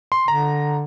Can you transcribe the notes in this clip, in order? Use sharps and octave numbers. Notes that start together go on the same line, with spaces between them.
C6
D3 A#5